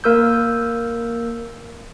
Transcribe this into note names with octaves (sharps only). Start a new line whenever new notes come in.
A#3 A#4 E6 G6